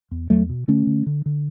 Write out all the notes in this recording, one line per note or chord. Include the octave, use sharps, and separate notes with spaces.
E2
E2 F#3 A3
B2
D3 A3 C#4
D3
D3
D3